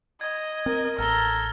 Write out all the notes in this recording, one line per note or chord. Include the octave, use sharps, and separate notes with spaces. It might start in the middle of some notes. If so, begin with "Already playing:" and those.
D#5 G#6
C4 A#4
A1 A4 A#5 F6 G7